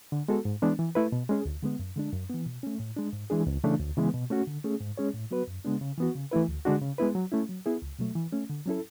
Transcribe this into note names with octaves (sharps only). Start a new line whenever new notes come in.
D3
G#3 B3 F#4 A4
G#2
E3 G#3 B3 D4
E3
A3 E4 B4
B2
G#3 C#4 G#4
D2
D3 G#3 B3
F#2
D3 G#3 D4
F#2
E3 B3
B2
A3 C#4
A2
G#3 D4
G#2
E3 G#3 D4 G#4
C#2
C#3 E3 A3 D4
D2
C#3 E3 G#3 B3
B2
A3 C#4 F#4
D3
A3 C#4 G#4
G#2
G#3 C#4 G#4 C#5
A2
F#3 B3 F#4 B4
F#2
C#3 G#3 B3 D4
C#3
E3 B3 F#4
C#3
E3 A3 E4 B4
D2
D3 G#3 D4 F#4
C#3
G#3 B3 E4 B4
F#3
A3 C#4 E4
F#3
B3 E4 G#4
C#2
B2 F#3 A3
E3
A3 C#4
D3
F#3 C#4 E4 A4